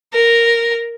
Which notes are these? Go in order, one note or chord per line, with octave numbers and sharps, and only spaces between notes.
A#4